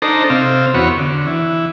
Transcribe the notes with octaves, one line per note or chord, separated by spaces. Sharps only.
D4 D#4 A4 C5 A#5
C3 C4 F5
E2 B3 F#4 C#5
D3
E3